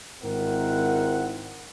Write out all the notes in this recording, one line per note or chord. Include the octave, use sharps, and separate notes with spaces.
G#1 G#2 C4 E4 A#4 F#5